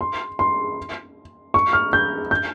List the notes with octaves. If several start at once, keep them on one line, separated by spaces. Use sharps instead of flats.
C6
C6
C#6
F6
G6
G6